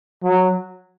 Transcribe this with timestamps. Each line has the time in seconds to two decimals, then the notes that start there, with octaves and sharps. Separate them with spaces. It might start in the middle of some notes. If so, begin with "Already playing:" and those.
0.24 F#3